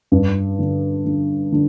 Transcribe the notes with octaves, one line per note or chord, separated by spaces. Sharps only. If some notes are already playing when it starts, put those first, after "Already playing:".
G2
D3
D3
D3